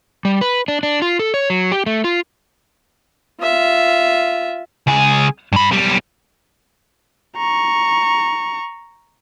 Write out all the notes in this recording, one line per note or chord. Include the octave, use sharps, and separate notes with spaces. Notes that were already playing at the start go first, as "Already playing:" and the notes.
G3
B4
D4
D4
F4
A4
C#5
F#3
G4
A3
F4
F4 E5
C#2 G#4
G2 B5
B1 G3
A#5 C#6